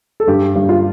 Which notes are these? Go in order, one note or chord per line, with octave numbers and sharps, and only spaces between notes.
A4
G2 G4
G2
F4